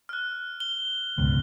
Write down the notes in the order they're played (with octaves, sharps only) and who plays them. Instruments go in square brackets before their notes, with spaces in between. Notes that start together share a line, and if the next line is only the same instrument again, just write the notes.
[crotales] F6 F#6
G7
[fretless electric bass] C#2 G#2 B2